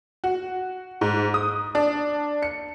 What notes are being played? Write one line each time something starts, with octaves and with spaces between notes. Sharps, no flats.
F#4
G#2
D#6
D4
C#7